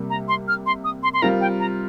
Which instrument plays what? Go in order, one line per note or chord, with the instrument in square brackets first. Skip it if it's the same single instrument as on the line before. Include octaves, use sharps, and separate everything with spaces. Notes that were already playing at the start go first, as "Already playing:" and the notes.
Already playing: [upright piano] C3 G3 A#3
[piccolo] A#5
C6
F6
C6
D#6
C6
C6
[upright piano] G3 C4 F4 A#4 [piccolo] A#5
[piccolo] G5
A#5